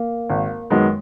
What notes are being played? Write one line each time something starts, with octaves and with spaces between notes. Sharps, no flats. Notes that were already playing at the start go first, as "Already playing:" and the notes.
Already playing: A#3
G#1
F#2 D#3 G#3 B3